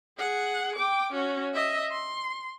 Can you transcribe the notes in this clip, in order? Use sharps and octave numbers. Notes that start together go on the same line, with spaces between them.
G#4 F#5
G5 D6
C#4 F#4
D#5 E5
C6